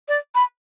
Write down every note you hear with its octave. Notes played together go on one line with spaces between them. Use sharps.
D5
B5